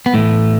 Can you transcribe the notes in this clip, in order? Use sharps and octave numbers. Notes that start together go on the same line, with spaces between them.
B3
A2 E3 A3